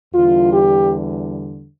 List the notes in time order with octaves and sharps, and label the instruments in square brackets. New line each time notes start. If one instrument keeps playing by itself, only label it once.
[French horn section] E2 D3 G3 F4
G4